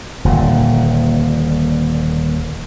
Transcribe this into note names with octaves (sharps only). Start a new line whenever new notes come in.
D#1 A#2 D3